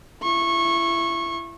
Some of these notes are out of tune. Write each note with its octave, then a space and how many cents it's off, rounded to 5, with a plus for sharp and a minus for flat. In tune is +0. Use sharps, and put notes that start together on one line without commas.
E4 +30 C#6 -20